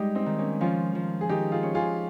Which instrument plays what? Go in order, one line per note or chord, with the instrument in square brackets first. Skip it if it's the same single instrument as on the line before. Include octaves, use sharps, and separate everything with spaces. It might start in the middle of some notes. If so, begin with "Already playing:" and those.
Already playing: [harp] G3 G#3 [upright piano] D#4 G4
[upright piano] C4 D#4
[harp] D#3
[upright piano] A#3 C#4
[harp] F3 [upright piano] C#4 F4
[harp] F3
[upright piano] G#4
[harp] D#3 [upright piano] D#4 G4
[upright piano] F4 G#4
[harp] C#4
[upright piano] F4 G#4